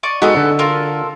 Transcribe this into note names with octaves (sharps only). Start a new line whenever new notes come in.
D5 D#5 C#6
G#3 B3 D#4 F#4 A4
D3
F4 A4 A#4